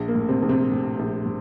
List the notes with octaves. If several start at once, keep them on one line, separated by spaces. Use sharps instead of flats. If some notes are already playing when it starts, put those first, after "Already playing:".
Already playing: A#1
A#3
A2
C3 C4
A#1
C3 C4
A2
A#1
A2